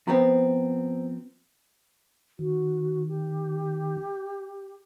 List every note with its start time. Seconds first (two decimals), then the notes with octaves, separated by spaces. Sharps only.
0.07 F3 B3 C4 C5 A#5
2.39 D#3 F#4
3.08 G4